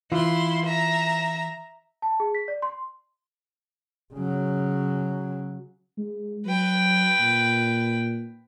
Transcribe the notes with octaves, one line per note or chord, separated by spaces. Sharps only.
E3 E4 F4 C6
E5 A#5
A5
G#4
B6
D5
C6
C#3 F#3
G#3
F#3 B4 G5
A#2